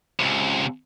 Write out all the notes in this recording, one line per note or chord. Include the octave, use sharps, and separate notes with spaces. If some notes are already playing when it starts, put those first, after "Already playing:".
C#2 C3